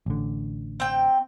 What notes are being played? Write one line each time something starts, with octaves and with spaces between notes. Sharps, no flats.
A1 D3
C4 G5